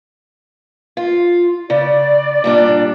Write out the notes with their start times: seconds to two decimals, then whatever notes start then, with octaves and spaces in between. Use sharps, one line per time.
0.97 F4
1.70 C#3 D5
2.44 A#2 G3 D4